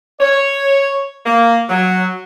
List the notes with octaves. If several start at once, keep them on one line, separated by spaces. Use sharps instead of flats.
C#5
A#3
F#3